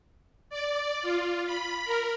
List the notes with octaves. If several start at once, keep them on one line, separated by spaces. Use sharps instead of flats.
D5
F4
B5
A#4